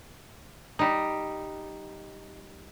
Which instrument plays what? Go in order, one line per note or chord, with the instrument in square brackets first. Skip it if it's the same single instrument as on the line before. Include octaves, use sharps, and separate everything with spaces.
[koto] G3 D#4